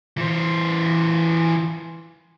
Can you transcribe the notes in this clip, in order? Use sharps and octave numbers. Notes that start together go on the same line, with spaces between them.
E3 C5